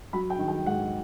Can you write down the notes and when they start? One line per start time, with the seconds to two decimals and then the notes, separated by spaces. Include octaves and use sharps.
0.13 F#3 B5
0.30 G5
0.39 D#3
0.48 G5
0.66 G#2 F#5